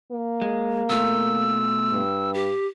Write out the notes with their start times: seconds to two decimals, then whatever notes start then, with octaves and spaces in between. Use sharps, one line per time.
0.12 A#3
0.42 G#3
0.90 B2 A3 F4 E6
1.92 G2
2.34 G4